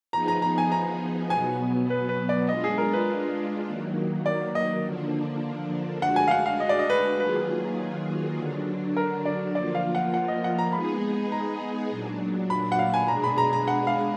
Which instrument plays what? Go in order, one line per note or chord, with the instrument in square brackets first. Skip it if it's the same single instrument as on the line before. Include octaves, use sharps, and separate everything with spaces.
[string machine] F3 B3 D#4 G#4 [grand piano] A#5
[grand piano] A#5
A#5
G#5
A#5
[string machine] B2 F#3 B3 [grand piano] G#5
[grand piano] B4
B4
D5
[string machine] G#3 D4 F4 [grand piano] D#5
[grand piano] G#4
A#4
B4
[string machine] D#3 F#3 A#3
[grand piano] D5
D#5
[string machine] D3 F3 A#3 D4
[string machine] G#3 D4 F#4 [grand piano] F#5
[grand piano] G#5
F5
F#5
F5
D#5
D5
D#5
B4
[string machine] D#3 F#3 A#3 F4 G#4 [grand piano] B4
[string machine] D3 F#3 D4
[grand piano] A#4
D5
[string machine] F3 A#3 F4 [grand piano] D5
[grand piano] F5
F#5
F#5
D#5
F#5
A#5
[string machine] G#3 B3 D#4 G#4 [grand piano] B5
[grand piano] A#5
[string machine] A#2 F#3 D4
[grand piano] B5
F#5
F5
G#5
[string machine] B2 G#3 D4 G#4 [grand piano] A#5
[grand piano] B5
A#5
A#5
F#5
F5